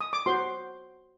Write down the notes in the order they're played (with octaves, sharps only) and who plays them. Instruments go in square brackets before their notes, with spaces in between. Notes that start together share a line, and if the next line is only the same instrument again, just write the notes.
[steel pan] D#6
D6
F#4 C5 C6